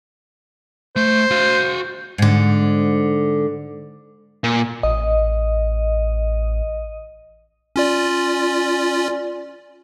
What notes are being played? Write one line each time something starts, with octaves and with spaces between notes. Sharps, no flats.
A3 C5
F#4 F5
G#2 D3
A#2
A1 D#5
C#4 F4 D5